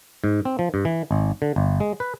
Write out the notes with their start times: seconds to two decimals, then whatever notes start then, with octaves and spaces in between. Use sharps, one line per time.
0.24 G#2
0.45 C4
0.59 F3
0.74 G2
0.85 E3
1.11 G#1
1.42 D3
1.56 G1
1.80 G#3
2.00 B4